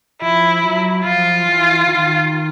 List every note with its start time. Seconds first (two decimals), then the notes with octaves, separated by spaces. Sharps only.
0.22 F3 E4
0.63 F#3
1.05 F3 F4
1.46 E3
1.87 D#3